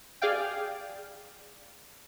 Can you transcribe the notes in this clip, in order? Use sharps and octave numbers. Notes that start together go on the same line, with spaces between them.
G#4 D5 F5 G5